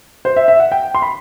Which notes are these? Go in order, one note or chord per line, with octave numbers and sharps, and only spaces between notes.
C5
E5
E5
F#5
G5
C6
B5